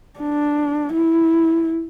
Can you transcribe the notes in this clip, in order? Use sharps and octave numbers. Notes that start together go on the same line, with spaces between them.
D4
E4